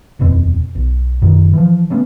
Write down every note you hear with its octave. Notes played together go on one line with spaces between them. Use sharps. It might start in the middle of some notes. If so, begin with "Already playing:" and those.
D#1 F2 B2 C4
B1
F#1 F#2 B2 D#3
E3 F3
F#3 A3 B3 C#4